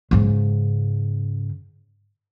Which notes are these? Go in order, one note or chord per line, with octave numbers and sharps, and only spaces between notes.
G#2 C#3